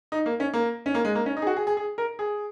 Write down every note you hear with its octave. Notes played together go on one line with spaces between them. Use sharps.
D#4
A#3
C#4
A#3
C#4
A#3
G#3
A#3
C#4
D#4
G#4
F#4
G#4
G#4
G#4
A#4
G#4